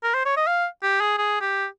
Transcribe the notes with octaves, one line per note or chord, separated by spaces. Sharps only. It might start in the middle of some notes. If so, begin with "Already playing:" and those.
A#4
C5
C#5
D#5
F5
G4
G#4
G#4
G4